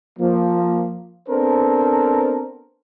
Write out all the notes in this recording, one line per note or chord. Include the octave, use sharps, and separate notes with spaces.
F3 A#3
B3 C4 D4 A4 A#4 C5